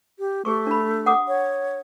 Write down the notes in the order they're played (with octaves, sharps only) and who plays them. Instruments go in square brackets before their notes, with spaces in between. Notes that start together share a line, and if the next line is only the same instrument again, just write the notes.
[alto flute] G4
[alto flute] A3 [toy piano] G4 G#4 C#6
[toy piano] D4 B5
F#5 D6 D#6
[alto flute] C#5